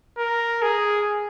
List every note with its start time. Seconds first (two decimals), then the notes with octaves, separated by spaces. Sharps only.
0.18 A#4
0.62 G#4